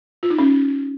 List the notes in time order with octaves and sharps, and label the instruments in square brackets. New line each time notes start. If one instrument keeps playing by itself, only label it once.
[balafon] F4
D#4
C#4